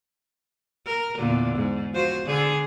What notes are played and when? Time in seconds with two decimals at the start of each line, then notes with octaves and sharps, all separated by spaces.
0.86 A#4
1.18 E2 A#2 D3
1.56 G#2
1.93 F3 F#4 C5
2.25 D3 G#4